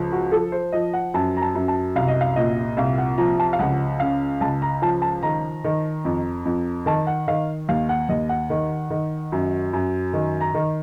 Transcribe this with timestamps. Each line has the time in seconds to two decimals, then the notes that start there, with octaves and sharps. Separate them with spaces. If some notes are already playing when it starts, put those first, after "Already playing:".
Already playing: C#2 F3
0.12 F#4
0.32 F3 A4
0.52 C5
0.72 F3 D#5
0.93 F#5
1.14 F#2 A5
1.37 A#5
1.42 A5
1.55 F#2
1.68 A5
1.96 C2 F5
2.08 D#5
2.21 F5
2.36 A#2 D#5
2.77 C2 F5
2.98 F#5
3.18 F3 A#5
3.39 A5
3.53 F5
3.59 C#2 F#5
4.00 C#3 F5
4.41 C#2 A5
4.62 A#5
4.82 F3 A5
5.02 A5
5.23 D#3 A#5
5.64 D#3
6.05 F2
6.45 F2
6.86 D#3 A5
7.07 F#5
7.27 D#3 F5
7.69 D#2 F5
7.89 F#5
8.09 D#2 D#5
8.29 F#5
8.50 D#3
8.90 D#3
9.32 F#2
9.73 F#2
10.13 D#3
10.41 A#5
10.54 D#3